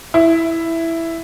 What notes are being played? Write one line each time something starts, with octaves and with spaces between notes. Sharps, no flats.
E4